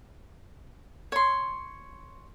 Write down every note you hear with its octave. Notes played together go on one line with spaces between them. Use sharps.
C#5 C6